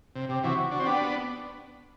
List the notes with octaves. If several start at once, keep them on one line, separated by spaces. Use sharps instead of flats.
C3
C3 G4
C3 E3 F#4
D4 F#4
C4
B3 D4 G4